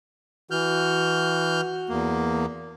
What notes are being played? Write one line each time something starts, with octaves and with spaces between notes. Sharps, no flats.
E3 F#4 F6 G6
E2 A#3